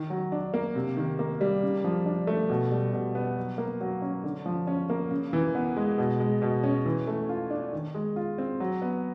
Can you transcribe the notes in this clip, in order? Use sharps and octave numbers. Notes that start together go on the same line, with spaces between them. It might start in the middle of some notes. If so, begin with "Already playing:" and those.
Already playing: D#3
F#3
D4
A#3
C3
D#3
A#3
G3
C#3
F3
D4
A3
B2
G3
B2
B3
F#3
A#3
F#3
C#4
D3
F3
C#4
A#3
C#3
E3
B3
G#3
B2
G#3
B2
C#4
E3
A3
F4
D4
D#3
G#3
F4
C4
F#3
B3